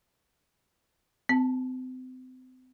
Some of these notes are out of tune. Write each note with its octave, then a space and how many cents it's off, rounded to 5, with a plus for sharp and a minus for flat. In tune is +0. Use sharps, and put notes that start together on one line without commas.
C4 -35 A5 +10